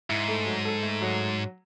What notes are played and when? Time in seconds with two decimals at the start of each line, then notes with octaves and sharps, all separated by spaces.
0.09 G#2 E4
0.28 A3
0.46 F#3
0.65 A4
0.83 A3
1.01 F#3